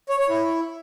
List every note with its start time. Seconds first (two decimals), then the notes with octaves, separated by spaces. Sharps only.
0.09 C#5
0.19 C#5
0.29 E4